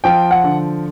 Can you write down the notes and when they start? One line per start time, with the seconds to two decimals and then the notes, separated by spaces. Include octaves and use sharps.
0.04 F3 G5
0.31 F#5
0.44 D3